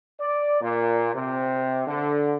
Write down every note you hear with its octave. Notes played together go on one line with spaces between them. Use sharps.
D5
A#2
C3
D3